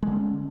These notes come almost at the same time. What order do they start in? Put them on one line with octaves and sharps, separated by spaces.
G#3 D3 C4 C#4